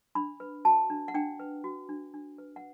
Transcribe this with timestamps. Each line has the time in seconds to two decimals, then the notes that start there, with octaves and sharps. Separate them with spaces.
0.15 D4 B5
0.40 B4
0.65 F#4 A5
0.90 D4
1.08 F#5
1.14 D4 G5
1.40 B4
1.64 F#4
1.89 D4
2.14 D4
2.38 B4
2.56 F#5